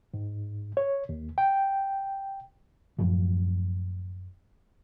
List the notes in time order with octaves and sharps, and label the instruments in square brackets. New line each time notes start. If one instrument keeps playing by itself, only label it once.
[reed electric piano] G#2
C#5
D#2
G5
[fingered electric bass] F#2 A2 F3 F#3